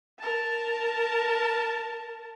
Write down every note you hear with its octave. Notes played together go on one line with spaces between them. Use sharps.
A#4 A5